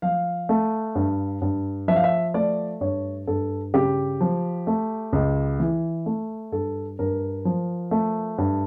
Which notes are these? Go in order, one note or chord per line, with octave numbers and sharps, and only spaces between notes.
F3 F5
A3
G2
G2
F3 E5
F5
E5
A3 D5
G2 C#5
G2 A4
C#3 G4
F3
A3
C#2
E3
A3
G2 A4
G2 A#4
F3
A3
G2